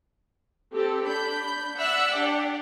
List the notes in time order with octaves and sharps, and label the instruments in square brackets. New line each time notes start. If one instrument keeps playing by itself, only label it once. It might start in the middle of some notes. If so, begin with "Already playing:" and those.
[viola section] C4 G4 A4
[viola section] D4 [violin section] B5 G6
[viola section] D5 F#5 [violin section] E5 E6 F#6
[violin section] D4 G4